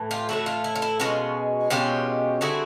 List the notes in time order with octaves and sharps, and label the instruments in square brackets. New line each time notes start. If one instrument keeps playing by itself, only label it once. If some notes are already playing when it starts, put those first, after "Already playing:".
Already playing: [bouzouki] A2 E3
F4 G4
A2 E3 A3 E4 F#4
F4
E4
F4
E4
B2 G#3 C#4 F4
B2 G#3 C#4 F4 G4
D3 G3 C4 E4 F#4 G#4